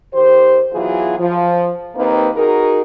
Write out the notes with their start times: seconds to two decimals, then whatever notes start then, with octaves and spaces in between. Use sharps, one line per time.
0.13 D#3 G4 C5
0.73 B2 E3 F#3 F4 G#4
1.17 F3
1.96 D#2 A#3 C4 D#4 B4
2.35 D#4 F#4 G#4 A#4